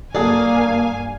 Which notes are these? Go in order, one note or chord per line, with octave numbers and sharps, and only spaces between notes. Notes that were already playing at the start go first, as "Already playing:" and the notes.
G2 F#3 A#3 G#4 A4 D5 F5 G#5